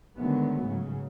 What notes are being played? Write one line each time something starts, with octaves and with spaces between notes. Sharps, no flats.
D3 D#3 F#3 G#3 A3 B3
G#2 C#3 F#3